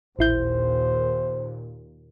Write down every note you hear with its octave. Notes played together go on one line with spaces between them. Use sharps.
A1 D#2 A#2 E4 C5 G6